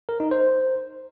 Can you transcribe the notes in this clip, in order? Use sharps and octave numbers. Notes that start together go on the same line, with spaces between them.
A#4
D#4
C5